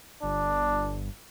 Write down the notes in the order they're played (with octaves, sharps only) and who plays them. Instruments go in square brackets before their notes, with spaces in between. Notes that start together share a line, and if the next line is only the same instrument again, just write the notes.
[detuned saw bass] G1 [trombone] D4